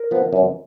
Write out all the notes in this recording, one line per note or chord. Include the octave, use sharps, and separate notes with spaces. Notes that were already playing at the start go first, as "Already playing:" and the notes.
Already playing: A#4
F3 B3
F#2